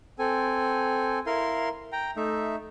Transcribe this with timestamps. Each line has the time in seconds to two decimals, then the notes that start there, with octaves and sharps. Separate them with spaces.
0.19 C4 A4 G#5
1.26 E4 A#4 F5 C6
1.92 G5 A#5
2.16 A3 D#4 E5